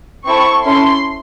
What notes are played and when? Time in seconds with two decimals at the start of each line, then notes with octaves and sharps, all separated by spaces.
0.26 C4 E4 A4 C#6
0.65 C#4 E4 A4 C6